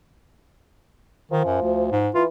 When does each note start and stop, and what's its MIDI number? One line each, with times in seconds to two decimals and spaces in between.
1.31 1.45 51
1.31 2.02 53
1.45 1.59 42
1.62 1.88 38
1.91 2.09 44
2.15 2.26 52
2.15 2.24 65